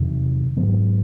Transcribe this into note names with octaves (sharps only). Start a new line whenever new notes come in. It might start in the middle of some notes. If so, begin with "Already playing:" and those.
Already playing: E2 C3 D#3 F#3
G#2 D#3 F#3 B3